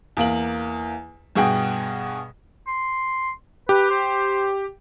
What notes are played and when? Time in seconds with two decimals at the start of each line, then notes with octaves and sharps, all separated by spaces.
0.17 E2 A#3 F#7
1.35 G2 B2 G#4 F#5 G5
2.67 C6
3.69 G4 B4
3.90 C5